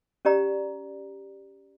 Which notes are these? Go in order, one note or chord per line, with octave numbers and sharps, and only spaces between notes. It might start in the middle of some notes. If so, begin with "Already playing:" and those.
C#4 G4 D5 A#5